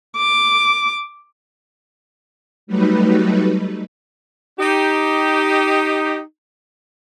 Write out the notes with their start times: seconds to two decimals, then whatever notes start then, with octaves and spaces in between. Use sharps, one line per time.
0.16 D6
2.67 F#3 G3 A3 D#4 B4
4.59 D#4 G4